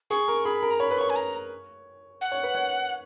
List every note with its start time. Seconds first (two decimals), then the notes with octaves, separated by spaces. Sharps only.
0.10 G#4 C#6
0.28 A#4
0.45 G#4 B5
0.62 A#4
0.71 A#5
0.80 C#5 B5
0.91 B4
0.98 C#5 C#6
1.10 G#5
1.16 A#5
2.21 F#5
2.32 C#5
2.43 B4
2.55 C#5